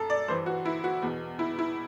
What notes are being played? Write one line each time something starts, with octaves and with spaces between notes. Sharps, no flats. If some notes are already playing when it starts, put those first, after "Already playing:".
Already playing: F#2 A4
D5
G2 E3 C5
F#4
E4
F#4
E2 B2
E4
E4